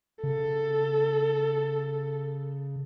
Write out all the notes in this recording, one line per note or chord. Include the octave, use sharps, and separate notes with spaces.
C#3 A4